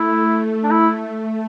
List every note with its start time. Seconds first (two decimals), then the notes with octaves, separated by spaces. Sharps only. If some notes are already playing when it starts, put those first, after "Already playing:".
Already playing: A3 E4
0.63 D4
0.71 E4